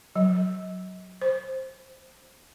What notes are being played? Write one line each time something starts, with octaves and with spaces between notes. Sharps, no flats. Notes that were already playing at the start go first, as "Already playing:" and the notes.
F#3
C5